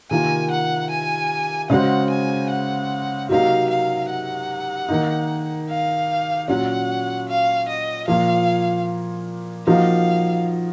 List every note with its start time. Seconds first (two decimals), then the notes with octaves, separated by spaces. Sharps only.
0.10 C3 D#3 A#3 F4 G#5
0.51 F#5
0.90 G#5
1.70 C#3 G#3 C4 F#4 F#5
2.10 G#5
2.50 F#5
3.29 C3 F#3 A#3 D#4 F#4 F5
3.70 F5
4.09 F#5
4.89 D#3 A#3 D#4
5.69 F5
6.48 A#2 F#3 C#4 F#5
7.28 F5
7.68 D#5
8.08 A#2 F3 A#3 F5
9.67 F3 A#3 D#4 F#4 F5